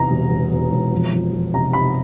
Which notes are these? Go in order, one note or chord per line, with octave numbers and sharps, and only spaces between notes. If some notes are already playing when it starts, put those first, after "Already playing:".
Already playing: E2 C3 A#5
E1
E1
E1
E1
F2
F2
F2
C3 A#5
C3 B5